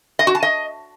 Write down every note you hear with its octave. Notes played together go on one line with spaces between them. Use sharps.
D#5
F#4
A5
D#5